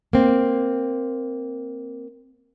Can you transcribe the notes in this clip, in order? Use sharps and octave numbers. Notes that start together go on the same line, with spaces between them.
A#3 C4